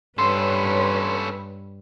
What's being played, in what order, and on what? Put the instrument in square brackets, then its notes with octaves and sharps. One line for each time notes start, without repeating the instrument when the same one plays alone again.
[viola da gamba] G2 [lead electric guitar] C#4 A4 [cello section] B4 C#5 [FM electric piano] C6